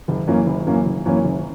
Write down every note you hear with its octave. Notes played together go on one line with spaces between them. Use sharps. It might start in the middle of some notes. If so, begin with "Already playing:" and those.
F#1
F#2 E3 A#3 C#4
F#1
F#2 E3 A#3 C#4
F#1
F#2 E3 A#3 C#4
F#1